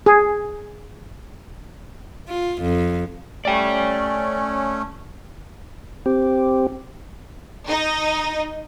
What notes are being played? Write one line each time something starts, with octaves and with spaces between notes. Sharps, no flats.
G#4
F4
F2
A3 C#4 D5 G5
C4 G4
D#4